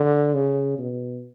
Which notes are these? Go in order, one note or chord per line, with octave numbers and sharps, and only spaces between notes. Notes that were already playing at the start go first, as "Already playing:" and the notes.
Already playing: D3
C#3
B2